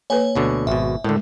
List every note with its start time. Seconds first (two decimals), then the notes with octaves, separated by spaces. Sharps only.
0.10 A#3 A4 B4 C#5 G#5
0.36 D2 B2 D3
0.67 G#1 B2 E5
1.04 A2 D3 G#3 A3 A#4